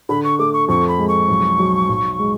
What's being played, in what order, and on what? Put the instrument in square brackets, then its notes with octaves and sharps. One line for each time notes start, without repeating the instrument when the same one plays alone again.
[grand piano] D3 [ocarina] B5
[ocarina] C#6
[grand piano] A3 [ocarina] D6
[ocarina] C#6
[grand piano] F2 [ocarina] C#6
[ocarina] B5
[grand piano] G#3
[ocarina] C#6
[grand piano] B1
F#3
B1
G#3